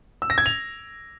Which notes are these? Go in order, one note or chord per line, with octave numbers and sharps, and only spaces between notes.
E6
A#6
G#6
F7